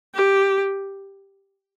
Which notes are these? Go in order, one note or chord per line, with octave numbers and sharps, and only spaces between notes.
G4